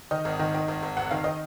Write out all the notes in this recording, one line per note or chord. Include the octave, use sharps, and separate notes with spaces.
D#3 D#5
G#1
D#3
D#3
G#1
G#1
F1 F#5
D#3 F5
D#3 D#5